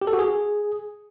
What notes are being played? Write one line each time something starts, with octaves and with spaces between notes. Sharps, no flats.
G4
A4
F#4
G#4